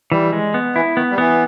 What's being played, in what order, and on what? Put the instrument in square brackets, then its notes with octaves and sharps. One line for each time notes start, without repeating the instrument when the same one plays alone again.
[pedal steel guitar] E3 [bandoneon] G3
[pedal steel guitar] G#3
B3
[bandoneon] E3 [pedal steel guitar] E4
[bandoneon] D#3 [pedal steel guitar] B3
[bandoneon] G3
[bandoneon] E3 [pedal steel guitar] B3